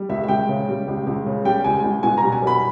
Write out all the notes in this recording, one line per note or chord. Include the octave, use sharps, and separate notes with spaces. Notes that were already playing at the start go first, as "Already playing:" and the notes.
Already playing: G3
C#2 E5
E5
C#2 G5
C#3
G3
C#2
C#2
C#3
G3 G5
C#2 G#5
C#2
B2 G#5
A#5
G3
G#5
B1 B5